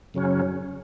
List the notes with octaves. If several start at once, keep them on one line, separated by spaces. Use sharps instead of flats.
F#2 C#3 F#3 C#4